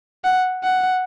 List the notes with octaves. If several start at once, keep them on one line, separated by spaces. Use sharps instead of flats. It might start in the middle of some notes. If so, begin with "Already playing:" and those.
F#5
F#5